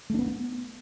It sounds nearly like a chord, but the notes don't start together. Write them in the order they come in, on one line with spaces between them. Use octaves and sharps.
A3 D4 B3